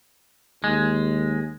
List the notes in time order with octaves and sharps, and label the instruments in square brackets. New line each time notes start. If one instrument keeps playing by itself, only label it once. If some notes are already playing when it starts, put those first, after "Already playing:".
[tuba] D#2 [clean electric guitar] G#3